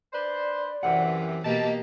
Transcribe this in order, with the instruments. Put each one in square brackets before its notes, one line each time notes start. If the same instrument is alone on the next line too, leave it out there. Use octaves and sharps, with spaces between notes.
[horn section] D4 B4 C5 [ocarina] D5
[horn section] F#2 C3 [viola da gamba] E3 [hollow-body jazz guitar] F#5
[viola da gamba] B2 A#3 G4 [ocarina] D#5 [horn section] A5